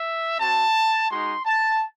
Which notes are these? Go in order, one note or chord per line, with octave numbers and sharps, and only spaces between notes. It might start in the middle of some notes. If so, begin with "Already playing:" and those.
Already playing: E5
C4 F#4 A5
G#3 D#4 F#4 C6
A5